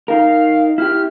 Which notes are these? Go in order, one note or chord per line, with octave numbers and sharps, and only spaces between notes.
D#4 A#4 F5
E4 G4 F6